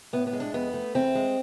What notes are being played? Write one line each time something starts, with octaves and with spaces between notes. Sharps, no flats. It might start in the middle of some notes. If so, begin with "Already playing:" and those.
A2 B3
B3
G#3
D4
F2 B3
A3
E2 C4
G#3